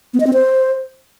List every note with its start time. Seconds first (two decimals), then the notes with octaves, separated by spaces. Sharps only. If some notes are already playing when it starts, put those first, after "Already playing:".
0.14 B3
0.20 D#5
0.27 C4
0.33 C5